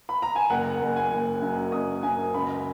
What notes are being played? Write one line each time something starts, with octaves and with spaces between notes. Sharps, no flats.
B5
A#5
G#5
F#1 F#5
F#1
G#5
F#1
F#2
F#1 D#6
F#2 G#5
C#2 B5